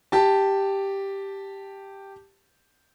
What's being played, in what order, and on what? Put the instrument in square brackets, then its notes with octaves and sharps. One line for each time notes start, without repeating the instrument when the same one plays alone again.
[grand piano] G4 A5